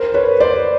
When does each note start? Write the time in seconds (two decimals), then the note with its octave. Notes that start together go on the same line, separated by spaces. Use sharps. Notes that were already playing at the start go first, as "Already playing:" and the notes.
Already playing: A#4 C5
0.14 B4 C#5
0.40 C5 D5